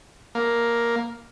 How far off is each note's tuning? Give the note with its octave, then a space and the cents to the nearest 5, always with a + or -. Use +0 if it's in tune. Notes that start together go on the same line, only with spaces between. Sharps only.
A#3 +5